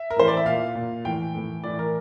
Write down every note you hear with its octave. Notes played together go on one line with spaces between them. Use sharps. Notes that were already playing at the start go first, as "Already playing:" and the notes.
Already playing: E5
A#4
A2 E3 C5
D5
E5
A#2 F5
A#2
A2 E3 G5
A2 E3
A2 E3 D5
A#4